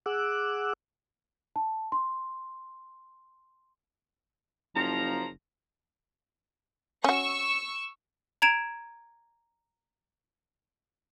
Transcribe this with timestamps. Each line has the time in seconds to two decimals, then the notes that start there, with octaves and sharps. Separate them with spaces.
0.06 G#4 F#5 D6 E6 F#6
1.56 A5
1.92 C6
4.75 F#1 F3 A#5
7.04 C#4 F#4 C#6 E6
8.42 A#5 G#6 D7 E7